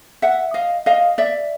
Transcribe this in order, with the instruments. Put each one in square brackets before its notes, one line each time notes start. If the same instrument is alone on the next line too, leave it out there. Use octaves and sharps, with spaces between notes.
[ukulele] E5 F#5
D#5 F5
D#5 F5
D5 E5